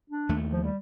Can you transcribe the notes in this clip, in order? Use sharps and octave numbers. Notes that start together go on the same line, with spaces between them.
D4
D#2 A3
F3
G3